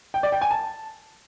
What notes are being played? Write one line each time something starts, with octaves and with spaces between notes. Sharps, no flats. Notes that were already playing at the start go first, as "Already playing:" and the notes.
G5
D5
G5
G#5
A5